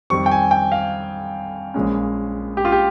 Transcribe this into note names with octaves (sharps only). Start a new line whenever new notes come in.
F2 D#3 G3 C4 C#6
G5
G#5
G5
F5
A#1 A#2 G#3 C#4
G4
F4
G4